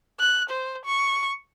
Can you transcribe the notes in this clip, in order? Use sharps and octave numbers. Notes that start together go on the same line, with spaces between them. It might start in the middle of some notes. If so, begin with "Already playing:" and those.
F#6
C5
C#6